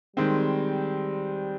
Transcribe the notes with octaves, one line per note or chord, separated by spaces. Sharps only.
D#3 G3 G#3 C4